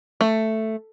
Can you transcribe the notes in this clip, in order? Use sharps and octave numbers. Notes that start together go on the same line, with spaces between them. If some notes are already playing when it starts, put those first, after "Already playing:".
A3